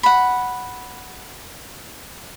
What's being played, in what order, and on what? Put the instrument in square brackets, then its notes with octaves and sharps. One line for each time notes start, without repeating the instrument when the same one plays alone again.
[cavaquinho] F#5 B5